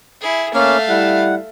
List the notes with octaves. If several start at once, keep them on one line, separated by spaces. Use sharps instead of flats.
E4 G#4
A3 A#3 C#4 F5
G3 E4 F#5